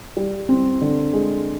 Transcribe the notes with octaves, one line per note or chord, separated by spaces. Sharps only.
G3
C4
D3
G#3